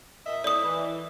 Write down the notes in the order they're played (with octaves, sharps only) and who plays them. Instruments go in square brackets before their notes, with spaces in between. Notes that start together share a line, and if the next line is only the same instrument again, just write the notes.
[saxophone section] A#2 D#5 E5
[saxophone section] A2 [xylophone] D5 D#6
[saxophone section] E3